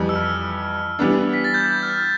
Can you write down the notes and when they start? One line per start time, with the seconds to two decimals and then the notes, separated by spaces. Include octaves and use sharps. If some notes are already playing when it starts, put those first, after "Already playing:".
Already playing: F2 E3 G3
0.09 E6
0.16 F6
0.99 E3 G3 B3 D4
1.33 B6
1.44 A6
1.54 G6
1.83 F6